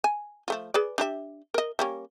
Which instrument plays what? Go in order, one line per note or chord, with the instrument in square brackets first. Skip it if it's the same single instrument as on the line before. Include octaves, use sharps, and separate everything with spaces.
[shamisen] G#5
F3 A3 F4
G#4 B4 D5
D4 G4 E5
A#4 D#5
G3 A#3 C#4